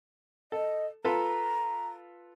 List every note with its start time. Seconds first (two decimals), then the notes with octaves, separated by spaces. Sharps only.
0.52 A4 D#5
1.05 F4 A4 B4 A#5